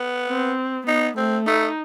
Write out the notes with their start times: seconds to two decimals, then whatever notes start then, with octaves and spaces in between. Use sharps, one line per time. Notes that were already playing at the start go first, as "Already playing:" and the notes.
Already playing: B3
0.28 C4
0.87 B3 D#4
1.17 A3 C4
1.47 A3 D#4